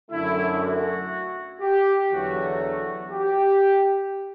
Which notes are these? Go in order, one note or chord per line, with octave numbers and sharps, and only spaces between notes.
F#2 D3 A3 E4
F#4
G4
E2 D3 F#3 A3 F#4
F#4
G4